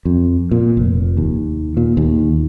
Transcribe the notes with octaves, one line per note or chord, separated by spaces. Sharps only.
F2
A#2
F1
D#2
A#2
D#2